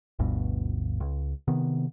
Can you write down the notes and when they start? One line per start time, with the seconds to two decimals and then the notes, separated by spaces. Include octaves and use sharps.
0.19 G1 D2 G2 B2
1.00 C#2
1.48 C3 D#3 B3